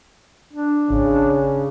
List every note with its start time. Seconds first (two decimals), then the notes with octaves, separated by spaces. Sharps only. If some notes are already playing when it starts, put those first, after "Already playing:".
0.53 D4
0.90 G#1 C#3